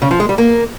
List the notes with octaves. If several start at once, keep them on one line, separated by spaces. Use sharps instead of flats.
C#3
F3
G#3
G3
A#3